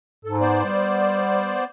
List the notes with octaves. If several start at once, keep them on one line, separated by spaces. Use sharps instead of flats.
G#2 A4
B3 C5 D5
G3